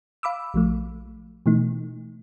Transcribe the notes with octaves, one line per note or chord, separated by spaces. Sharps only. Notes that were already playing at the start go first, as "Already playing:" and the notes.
F5 B5 D6 E6
A#1 F3 A3
B2 E3 A3 D#4